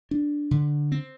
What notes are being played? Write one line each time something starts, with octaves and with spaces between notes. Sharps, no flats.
D4
D3
C4